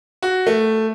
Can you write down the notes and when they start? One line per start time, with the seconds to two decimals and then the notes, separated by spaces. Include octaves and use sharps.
0.22 F#4
0.47 A3